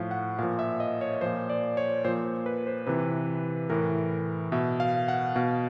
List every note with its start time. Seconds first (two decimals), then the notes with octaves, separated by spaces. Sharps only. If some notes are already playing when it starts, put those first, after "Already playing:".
Already playing: A2 F3 F5
0.11 F#5
0.39 A#2 F3 F5
0.59 E5
0.80 D#5
1.01 C#5
1.15 C#5
1.21 A#2 F3 C5
1.49 D5
1.77 C#5
2.05 A#2 F3 C5
2.25 C5
2.46 B4
2.67 C5
2.87 C3 E3 B4
3.70 A2 E3 A#4
4.52 B2 E5
4.80 F5
5.08 F#5
5.35 B2 F5